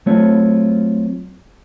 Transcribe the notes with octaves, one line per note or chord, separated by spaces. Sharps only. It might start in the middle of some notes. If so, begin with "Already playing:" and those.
F#3 A3 C4 F4 C#5